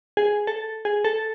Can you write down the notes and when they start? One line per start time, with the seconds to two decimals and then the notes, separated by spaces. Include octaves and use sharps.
0.17 G#4
0.47 A4
0.85 G#4
1.04 A4